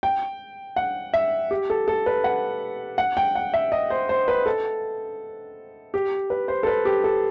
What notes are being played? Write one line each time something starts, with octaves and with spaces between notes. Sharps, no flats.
G5
F#5
E5
G4
A4
A4
B4
F#5
F#5
G5
F#5
E5
D#5
C5
C5
B4
A4
G4
B4
C5
A4
B4
G4
A4